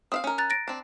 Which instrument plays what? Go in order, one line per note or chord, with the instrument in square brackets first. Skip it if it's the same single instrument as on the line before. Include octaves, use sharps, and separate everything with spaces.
[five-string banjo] C4 E5 F5 [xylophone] D#6
[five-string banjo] C#4 A#4
[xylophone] A#5 F#6 A6
A6 A#6 D7
[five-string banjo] C4 D4